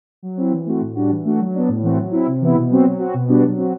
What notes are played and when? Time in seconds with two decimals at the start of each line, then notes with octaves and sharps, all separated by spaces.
0.22 F#3
0.37 C4 E4
0.52 E3
0.66 A3 C4 F#4
0.81 A2
0.95 G3 D4 F#4
1.10 E3
1.25 A3 D4 F#4
1.39 F#3
1.54 B3 D4
1.68 A2
1.83 E3 A3 C4 F#4
1.97 F#3
2.12 C4 E4
2.26 C3
2.41 E3 B3 E4
2.55 B2
2.70 F#3 C4 F#4
2.85 F#3
2.99 C4 F#4
3.14 B2
3.28 G3 B3 D4 F#4
3.43 F#3
3.57 C4 F#4